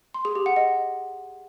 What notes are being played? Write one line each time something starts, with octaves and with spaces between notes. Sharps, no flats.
C6
G#4
G4
F#5
D#5